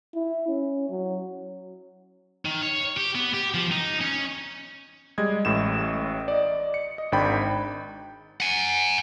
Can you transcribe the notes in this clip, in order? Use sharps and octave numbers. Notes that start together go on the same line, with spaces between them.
E4
C#4
F#3
D#3
C#5
G4
B3
G4
F3
D#4
C#4
G3 G#3 D#5 G#6
A1 A2 E7
D5 D#5
C#7
D#5
G#1 G#2 D4 G5 B5
F#5 G#5